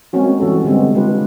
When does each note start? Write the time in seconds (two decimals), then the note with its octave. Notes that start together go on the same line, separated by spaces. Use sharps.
0.13 G#3 A#3 C4 C#4 F#4
0.40 E3 G3 F#4 A4
0.64 D3 G3 G#3 B3 C4
0.94 C#3 G#3 D4 F4 G4 B4